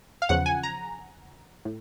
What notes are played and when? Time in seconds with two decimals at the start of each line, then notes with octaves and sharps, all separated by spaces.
0.22 F5
0.29 E2 C#3 F3 F#5
0.46 G#5
0.63 A#5
1.65 A2